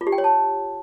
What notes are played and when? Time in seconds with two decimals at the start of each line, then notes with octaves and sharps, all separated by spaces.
0.01 F4
0.07 G4
0.12 G5
0.18 C#5
0.24 A5